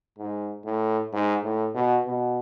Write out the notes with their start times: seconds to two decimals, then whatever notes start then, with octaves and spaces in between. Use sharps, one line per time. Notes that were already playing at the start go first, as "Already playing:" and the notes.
0.18 G#2
0.65 A2
1.13 G#2
1.44 A2
1.75 B2
2.06 B2